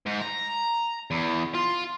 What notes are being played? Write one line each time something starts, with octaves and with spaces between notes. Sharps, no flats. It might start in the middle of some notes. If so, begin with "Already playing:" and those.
G#2
A#5
E2
F4